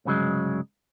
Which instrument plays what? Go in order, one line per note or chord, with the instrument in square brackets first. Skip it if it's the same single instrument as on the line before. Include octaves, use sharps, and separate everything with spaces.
[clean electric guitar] C2 G2 C#3 F#3 G#3